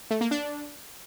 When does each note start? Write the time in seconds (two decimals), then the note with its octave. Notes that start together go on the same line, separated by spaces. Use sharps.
0.11 A3
0.21 A#3
0.31 D4